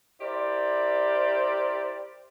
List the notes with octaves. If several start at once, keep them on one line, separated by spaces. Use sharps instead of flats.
E4 G4 A#4 C5 D5